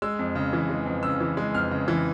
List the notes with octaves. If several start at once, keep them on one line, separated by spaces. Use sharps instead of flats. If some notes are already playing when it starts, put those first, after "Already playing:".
G#3 E6
F2
C#3
E3
G#3
F2
C#3 E6
E3
G#3
F2 F6
C#3
E3